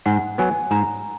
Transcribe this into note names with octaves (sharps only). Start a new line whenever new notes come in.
G#2 F#5
F#3 B3 G#5
G#2 A#5